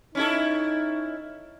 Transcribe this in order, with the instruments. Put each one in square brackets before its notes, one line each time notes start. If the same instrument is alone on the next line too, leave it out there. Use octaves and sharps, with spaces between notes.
[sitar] C#4 E4 A4 [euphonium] D#4